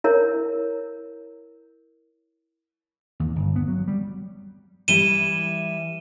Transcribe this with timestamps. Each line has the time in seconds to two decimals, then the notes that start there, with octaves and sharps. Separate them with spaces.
0.04 E4 A#4 C#5
3.20 D#2
3.36 G1
3.56 B3
3.68 F#3
3.88 G3
4.88 E3 G3 E4 D#7 E7 G7